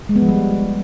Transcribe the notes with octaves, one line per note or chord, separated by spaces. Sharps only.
G#3
B3
F3
G3